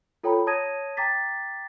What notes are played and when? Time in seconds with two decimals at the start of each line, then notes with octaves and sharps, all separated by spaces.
0.23 F4 A4 C#5 G5 A#5 B5
0.47 C#5 A5 D#6 G#6 A#6 D#7
0.97 G5 A#5 D6 A6 B6